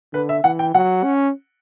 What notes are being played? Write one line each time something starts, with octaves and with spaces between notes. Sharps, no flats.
D3 B4
E5
E3 F#5
G5
F#3 F#5
C#4